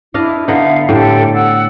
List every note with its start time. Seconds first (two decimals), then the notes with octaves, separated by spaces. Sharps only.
0.14 D4 E4 D#5 F5
0.48 D3 B3 D#4 E5 F5
0.89 A2 D3 G4 A4 G5
1.33 F#5 E6